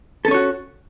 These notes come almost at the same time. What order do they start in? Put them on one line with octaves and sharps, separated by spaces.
A4 C#4 C#5 F#4